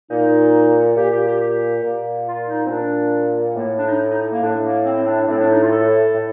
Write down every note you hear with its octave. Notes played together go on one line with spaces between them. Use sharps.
A#2 D#4
A#2 G4
G4
G4
G4
A#2
F4
D#4
C4
A#2 D4
A2 A#3
D4
D#4
D#4
A#3
A2 D4
A#3
C4
D4
A2 C4
D4
D#4
F4
A4
A2